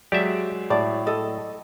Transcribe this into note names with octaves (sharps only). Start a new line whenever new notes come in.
F#3 G#3 G4 D5 E5
A2 D5
A4 D#5